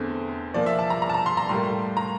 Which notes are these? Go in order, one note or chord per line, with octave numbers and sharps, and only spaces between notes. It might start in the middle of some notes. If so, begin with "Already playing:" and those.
Already playing: E2 D3 A3 C4
A#2 F3 A#3 D5
E5
A5
A#5
A#5
A5
A#5
C6
A#5
A2 G3 A#3 C6
A#5